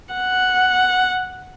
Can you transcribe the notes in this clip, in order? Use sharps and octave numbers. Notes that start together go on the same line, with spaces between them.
F#5